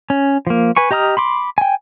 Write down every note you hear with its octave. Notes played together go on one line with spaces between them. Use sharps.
C#4
F3 A#3
B4 G#5 C#6
G4 D#5 A#5 D#6 F6
B5 C6 D6
G5 G#5